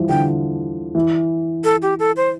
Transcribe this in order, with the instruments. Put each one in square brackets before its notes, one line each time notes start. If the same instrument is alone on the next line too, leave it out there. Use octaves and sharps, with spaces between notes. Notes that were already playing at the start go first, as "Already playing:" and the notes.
Already playing: [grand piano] E3 F3 G3
[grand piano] D3 [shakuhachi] G5
[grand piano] E3
[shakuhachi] A4
G4
A4
C5